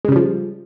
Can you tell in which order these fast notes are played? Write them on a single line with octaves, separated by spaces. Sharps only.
G#3 C#3 G3 F3